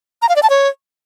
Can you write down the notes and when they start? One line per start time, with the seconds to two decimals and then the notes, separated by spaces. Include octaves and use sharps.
0.22 A#5
0.29 F5
0.36 D5
0.43 A5
0.50 C#5